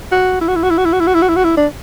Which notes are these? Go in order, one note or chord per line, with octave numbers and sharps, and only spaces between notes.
F#4
E4
F#4
E4
F#4
E4
F#4
E4
F#4
E4
F#4
E4
F#4
E4
F#4
E4
D4